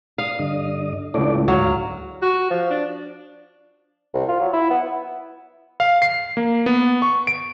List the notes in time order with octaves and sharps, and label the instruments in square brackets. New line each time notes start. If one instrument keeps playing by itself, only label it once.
[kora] F5 [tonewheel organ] D#6
[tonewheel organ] G2 D3 D#5
[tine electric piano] C#2 A2 [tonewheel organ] A3 D4 D5
[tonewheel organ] D2 G#2 F5 [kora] F#3
[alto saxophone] F#4
F3
D4
[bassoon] C2
F4
F#3
E4
B3
[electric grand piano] F5
C7
A#3
B3
C#6
D7